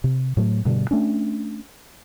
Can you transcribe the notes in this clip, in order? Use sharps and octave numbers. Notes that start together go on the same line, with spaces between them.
C3
A2 F#3 A3
G2 B2 D3 G3
A3 C#4 D4